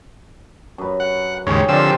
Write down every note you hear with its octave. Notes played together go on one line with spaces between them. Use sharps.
F#2 B4
F#5
D#2 G#2 C#3 G4 G#4 C#5
D3 F3 C4 A#4 D5 E6